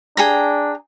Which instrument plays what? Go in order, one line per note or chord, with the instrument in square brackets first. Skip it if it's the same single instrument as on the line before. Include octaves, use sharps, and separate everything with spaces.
[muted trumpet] D4 [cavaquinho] G#4 G5 A#5